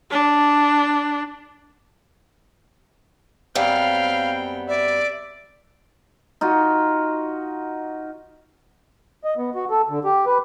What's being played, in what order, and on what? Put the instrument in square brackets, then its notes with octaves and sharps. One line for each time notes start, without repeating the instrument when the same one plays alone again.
[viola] D4
[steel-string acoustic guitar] F#2 G3 B3 [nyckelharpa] C4 G5 [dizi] F5
[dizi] D5 [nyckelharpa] E5
[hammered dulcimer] D#4 F4 F#4
[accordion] D#5
B3
F#4
A4
D3
G4
B4